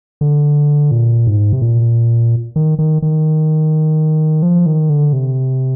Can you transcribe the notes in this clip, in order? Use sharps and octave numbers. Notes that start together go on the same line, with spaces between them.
D3
A#2
G#2
C3
A#2
D#3
D#3
D#3
F3
D#3
D3
C3